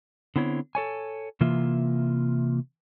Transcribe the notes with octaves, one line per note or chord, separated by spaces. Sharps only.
D3 B3 C4 E4 C#5
A4 C#5 G#5
C3 E3 A#3 F4 E5